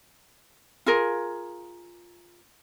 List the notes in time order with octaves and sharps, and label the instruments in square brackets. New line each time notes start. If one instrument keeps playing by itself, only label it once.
[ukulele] F4 G#4 A#4